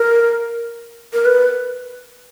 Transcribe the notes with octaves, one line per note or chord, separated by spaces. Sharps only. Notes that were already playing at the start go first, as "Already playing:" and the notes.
Already playing: A#4
A#4
B4